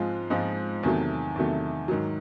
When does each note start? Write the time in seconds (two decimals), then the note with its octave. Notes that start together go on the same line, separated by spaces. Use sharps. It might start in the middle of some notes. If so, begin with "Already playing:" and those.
Already playing: G#2 F3 G#3 C4 F4
0.30 G#2 F3 G#3 C4 F4
0.83 E2 C3 D#3 F#3 A3
1.36 E2 C3 D#3 F#3 A3
1.88 G#2 D#3 F#3